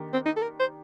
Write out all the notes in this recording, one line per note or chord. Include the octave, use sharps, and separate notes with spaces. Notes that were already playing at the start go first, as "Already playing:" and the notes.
Already playing: D#3 A#3 D4 G4
C4
D#4
A4
A#4
C5